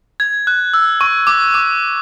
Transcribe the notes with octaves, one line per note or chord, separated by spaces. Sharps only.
G#6
F#6
E6
C#6
D6
D6